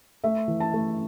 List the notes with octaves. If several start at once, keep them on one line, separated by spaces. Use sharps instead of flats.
A3 E5
E3
A5
A3